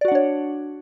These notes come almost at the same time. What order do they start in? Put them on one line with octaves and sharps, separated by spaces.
D5 F#4 F#5 D4 C#5